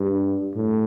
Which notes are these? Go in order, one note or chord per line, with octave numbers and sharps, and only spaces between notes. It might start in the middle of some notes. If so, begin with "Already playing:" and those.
Already playing: G2
A2